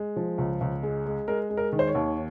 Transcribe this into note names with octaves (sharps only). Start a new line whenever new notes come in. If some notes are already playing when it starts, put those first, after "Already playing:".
Already playing: G#3
F3
C#2
C#2
G#3
G#3
G#3 A#4
G#3
A#4
D#3
C5
C#5
D#2